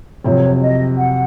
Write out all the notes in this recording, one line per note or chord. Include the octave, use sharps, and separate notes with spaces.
F2 C3 F#3 C#5
D#5
F#5